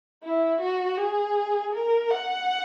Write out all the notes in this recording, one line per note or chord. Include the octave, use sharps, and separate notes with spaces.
E4
F#4
G#4
A#4
F#5